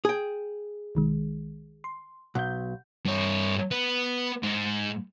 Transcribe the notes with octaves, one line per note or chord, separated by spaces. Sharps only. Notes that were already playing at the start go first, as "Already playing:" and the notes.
G#4 G5
B1 D#3 G#3
C6
B1 F#5 G6
G2 C#5
B3
G#2